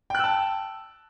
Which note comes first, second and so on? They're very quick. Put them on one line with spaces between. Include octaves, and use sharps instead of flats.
G5 F#6 E6 A5